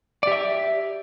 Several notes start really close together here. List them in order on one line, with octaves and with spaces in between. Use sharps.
D5 G4 E5